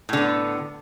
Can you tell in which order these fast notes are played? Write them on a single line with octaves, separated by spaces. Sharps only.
A2 D3 B3